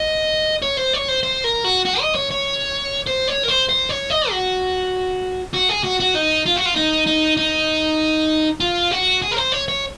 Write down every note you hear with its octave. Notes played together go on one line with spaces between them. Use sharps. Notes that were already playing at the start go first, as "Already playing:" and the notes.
Already playing: D#5
C#5
C5
C#5
C5
C5
A#4
F#4
F#4
D#5
C#5
C#5
C5
C#5
A#4
C5
C5
C#5
D#5
F#4
F#4
G#4
F#4
F#4
D#4
F4
F#4
F4
D#4
D#4
D#4
F4
F#4
G#4
A#4
C5
C#5
C#5